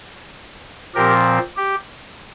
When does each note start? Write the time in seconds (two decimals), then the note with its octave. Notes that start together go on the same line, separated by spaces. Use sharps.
0.95 A#2 F3 C4 G4 A#4
1.57 G4